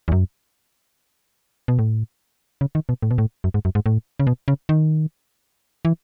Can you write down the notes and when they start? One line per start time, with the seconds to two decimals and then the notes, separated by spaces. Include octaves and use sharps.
0.08 E2
0.12 F#2
1.68 B2
1.79 A2
2.61 C#3
2.75 D#3
2.89 B2
3.02 A2
3.11 B2
3.18 A2
3.44 F#2
3.54 G#2
3.65 F#2
3.75 G#2
3.86 A2
4.20 C#3
4.27 B2
4.48 C#3
4.69 D#3
5.85 E3